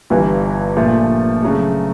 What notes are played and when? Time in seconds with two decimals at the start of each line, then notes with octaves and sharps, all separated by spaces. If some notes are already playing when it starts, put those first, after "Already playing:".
0.10 G1 G2 E3
0.76 A#2 F3 A3
1.42 C#3 F#3 A3